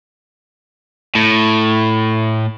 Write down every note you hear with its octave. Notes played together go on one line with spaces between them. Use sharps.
A2